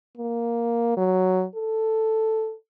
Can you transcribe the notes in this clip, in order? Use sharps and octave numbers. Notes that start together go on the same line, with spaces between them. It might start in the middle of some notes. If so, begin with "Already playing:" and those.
A#3
F#3
A4